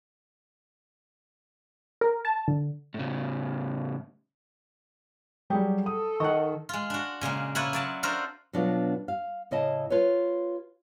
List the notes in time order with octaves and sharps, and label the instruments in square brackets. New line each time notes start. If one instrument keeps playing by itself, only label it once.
[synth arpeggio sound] A#4
A5
D3
[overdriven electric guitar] A2 C#3
[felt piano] F#3 G3 [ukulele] G4 G#4 F#5
[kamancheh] A4 [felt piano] D#6
[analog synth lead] D#3 [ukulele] D#5 F#5 [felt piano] C#6
[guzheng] G#3 F4
D4 F#4
A#2 C#3 G#3 A#3
A#3 E4 F4 B4 C#5 F#5
F#3 D5 A5
D4 F4 F#4 A4 A#4 C5
[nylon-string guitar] B2 F#3 D4 F4 B4 F5
F5
A2 C#3 E4 C#5 D#5 A5
F4 B4 C#5